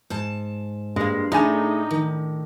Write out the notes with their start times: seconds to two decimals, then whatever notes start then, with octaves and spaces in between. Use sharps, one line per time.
0.10 G#2 A5
0.96 G2 G#3 A#3
1.32 A2 A3 D4 D#4 G#4 G#5
1.91 D#3